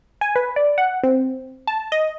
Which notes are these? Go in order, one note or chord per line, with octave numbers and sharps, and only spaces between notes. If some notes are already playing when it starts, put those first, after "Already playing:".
G#5
B4
D5
F#5
C4
A5
D#5